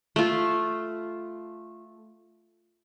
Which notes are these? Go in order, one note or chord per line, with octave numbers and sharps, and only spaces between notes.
A3 F4